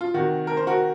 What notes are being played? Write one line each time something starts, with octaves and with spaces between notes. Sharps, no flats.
F4
C3 D#3 F#4
A#4
C5
F#4 A#4